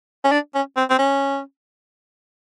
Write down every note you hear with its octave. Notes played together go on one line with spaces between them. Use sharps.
C#4
D4
C#4
C4
C4
C#4